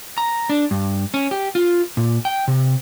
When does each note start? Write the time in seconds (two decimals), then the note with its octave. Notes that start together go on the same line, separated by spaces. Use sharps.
0.18 A#5
0.50 D4
0.71 G2
1.14 C#4
1.31 G4
1.55 F4
1.97 A#2
2.25 G5
2.48 C3